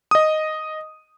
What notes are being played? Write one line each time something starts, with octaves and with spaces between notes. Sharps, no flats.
D#5 D#6